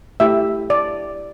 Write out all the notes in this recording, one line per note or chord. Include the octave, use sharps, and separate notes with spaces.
A3 E4 G4 E5
D5